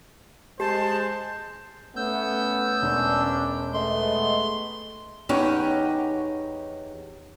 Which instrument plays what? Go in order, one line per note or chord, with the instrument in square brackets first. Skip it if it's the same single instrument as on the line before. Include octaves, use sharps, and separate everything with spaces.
[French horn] G#3 [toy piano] G4 [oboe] C5 [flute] A5
[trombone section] A3 C#4 [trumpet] B3 [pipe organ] E6 G6
[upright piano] E1 [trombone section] C#4 D4
[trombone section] G#3 A3 B3 [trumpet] D#5 [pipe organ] C6
[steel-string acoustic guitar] E2 C#4 D#4 G4 C#5 F#5